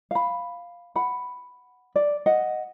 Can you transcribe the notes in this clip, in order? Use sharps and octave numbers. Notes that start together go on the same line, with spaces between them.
F5 B5
F#5 B5
D5
D#5 F#5